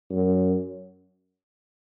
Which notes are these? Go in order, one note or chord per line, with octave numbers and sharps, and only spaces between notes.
F#2